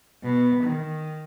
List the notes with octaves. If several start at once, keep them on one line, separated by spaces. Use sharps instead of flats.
B2
D#3